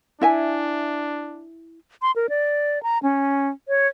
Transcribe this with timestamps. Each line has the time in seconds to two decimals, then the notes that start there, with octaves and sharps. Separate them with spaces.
0.21 D4 E4 E5 G#5
2.02 C6
2.16 A#4
2.29 D5
2.83 A#5
3.03 C#4
3.68 C#5